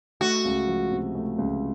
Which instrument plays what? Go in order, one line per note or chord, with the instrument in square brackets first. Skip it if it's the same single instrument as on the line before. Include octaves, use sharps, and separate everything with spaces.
[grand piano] A3 [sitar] F#4
[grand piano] C#2
F3
C3
A3
C#2